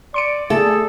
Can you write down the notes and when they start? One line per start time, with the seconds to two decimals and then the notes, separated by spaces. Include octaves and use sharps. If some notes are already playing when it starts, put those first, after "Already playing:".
0.14 D5 C6 C#7 D7
0.50 A3 G#4 A4